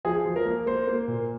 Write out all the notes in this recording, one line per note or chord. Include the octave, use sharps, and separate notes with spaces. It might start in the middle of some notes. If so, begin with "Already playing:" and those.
F3 G#4
F3
A#4
A#3
A#3 C5
A#3
A#2